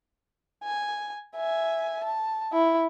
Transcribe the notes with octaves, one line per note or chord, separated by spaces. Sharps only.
G#5
E5 G#5
A5
E4